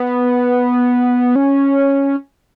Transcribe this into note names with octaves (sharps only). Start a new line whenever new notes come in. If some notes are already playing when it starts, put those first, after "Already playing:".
Already playing: B3
C#4